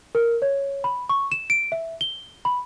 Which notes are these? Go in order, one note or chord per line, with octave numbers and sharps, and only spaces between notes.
A#4
C#5
B5
C#6
E7
D7
E5
G7
B5